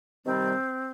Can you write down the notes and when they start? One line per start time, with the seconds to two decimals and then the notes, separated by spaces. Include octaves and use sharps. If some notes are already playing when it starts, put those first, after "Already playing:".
0.25 C3 D#3 G3 C4